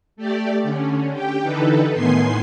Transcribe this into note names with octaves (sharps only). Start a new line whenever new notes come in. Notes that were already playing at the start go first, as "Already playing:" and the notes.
A3 G4 D5
D3 C#4
G4 G5
D3 E3 D#4 A4 B4
A2 D#3 B3 G#5 C6 C7